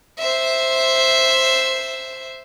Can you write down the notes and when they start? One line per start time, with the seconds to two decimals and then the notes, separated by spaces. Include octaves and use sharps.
0.18 C5 E5